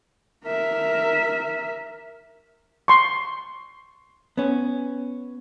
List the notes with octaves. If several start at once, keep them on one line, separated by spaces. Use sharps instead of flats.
A#4 E5
C6 C#6
B3 C#4